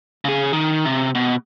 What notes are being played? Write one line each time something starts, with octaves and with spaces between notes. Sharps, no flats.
C#3 G#4
D#3
C3
B2